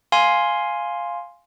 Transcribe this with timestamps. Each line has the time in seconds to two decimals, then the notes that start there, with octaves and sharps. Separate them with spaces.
0.12 F5 G#5 C6